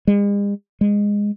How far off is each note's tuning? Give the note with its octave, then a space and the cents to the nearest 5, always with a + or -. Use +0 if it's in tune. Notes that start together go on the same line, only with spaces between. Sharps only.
G#3 -45
G#3 -15